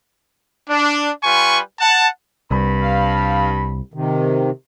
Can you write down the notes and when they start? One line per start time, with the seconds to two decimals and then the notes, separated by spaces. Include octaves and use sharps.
0.69 D4
1.24 G3 F4 B4 G#5 C#6
1.80 F#5 A5
2.51 C2 G2 B5
2.82 F5
3.94 C3 D#3